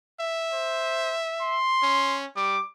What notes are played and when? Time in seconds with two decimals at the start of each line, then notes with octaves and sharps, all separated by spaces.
0.21 E5
0.53 C5
1.42 C6
1.83 C#4
2.36 G3 D6